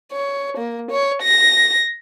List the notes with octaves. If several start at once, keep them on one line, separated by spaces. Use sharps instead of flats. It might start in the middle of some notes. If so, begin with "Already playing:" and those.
C#5
A#3
C#5
A#6